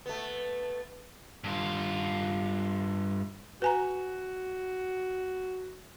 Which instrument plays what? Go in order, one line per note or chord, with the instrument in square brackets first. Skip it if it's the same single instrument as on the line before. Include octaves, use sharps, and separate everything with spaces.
[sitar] A3 B3
[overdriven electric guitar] G2 F4
[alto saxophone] F#4 [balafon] B4 G#5 A#5